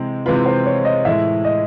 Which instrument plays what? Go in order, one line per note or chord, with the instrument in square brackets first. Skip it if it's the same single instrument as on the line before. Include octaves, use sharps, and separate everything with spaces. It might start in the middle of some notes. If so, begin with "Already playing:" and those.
Already playing: [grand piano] C3 E3 G#3 C4
[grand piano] C3 E3 G#3 C4 F4 [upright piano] B4
[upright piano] C5
C#5
D#5
[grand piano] A2 E3 G#3 [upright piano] E5
[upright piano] D#5